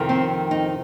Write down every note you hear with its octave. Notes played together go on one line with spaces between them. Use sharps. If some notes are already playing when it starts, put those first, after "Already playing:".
Already playing: F2 C3 D#3
C4
D#4